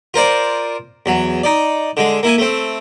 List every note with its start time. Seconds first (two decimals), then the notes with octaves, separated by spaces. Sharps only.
0.14 F4 A#4 C5 D5
1.06 E2 F#3
1.44 D#4 D5
1.97 D3 G#3
2.23 A#3 E4 G#5
2.38 A3 C4